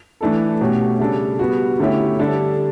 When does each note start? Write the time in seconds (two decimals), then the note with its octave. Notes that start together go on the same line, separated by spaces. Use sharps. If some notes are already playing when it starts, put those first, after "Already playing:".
0.21 E3 A3 D4 A4
0.61 B2 A3 C#4 G4
1.00 C#3 G3 D4 A4
1.39 G3 B3 F#4
1.79 D3 A3 C#4 E4 G4
2.19 D3 G3 D4 A4